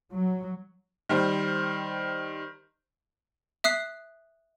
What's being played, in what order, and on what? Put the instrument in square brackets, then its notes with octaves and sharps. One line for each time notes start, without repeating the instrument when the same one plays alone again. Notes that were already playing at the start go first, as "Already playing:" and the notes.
[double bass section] F#3
[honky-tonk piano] D#3 G3 C5
[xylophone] E5 D#6 F#6 C7